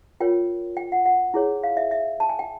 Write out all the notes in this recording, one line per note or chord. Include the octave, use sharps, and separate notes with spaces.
F4 A#4 C#5 G5
G5
F#5
F#5
E4 G#4 C#5
F5
E5
E5
A5
G#5
G5